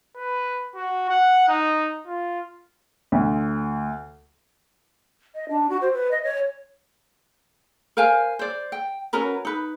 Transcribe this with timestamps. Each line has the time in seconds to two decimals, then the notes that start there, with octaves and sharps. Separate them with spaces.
0.17 B4
0.76 F#4
1.09 F#5
1.49 D#4
2.07 F4
3.12 D2
5.35 D#5
5.48 D4
5.69 F#4
5.81 C5
5.93 B4
6.11 D#5
6.23 C#5
7.97 A#4 C5 F5 G#5
8.39 C5 D5
8.72 G5
9.13 C#4 F#4 A#4 B4
9.45 D#4 B4